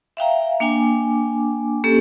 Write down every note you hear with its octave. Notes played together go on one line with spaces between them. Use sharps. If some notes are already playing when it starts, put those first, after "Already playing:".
E5 F5 G5 A#5
A#3 D4 G5 G#5 D6
A#3 C#4 G4 A4